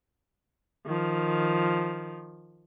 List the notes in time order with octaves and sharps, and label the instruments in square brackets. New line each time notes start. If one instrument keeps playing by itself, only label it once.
[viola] D#3 F3